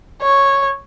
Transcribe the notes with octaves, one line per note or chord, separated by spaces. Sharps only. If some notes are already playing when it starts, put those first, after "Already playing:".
C#5